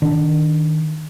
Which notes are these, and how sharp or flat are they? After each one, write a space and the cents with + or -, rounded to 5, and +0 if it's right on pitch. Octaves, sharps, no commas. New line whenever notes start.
D#3 +5 D4 +0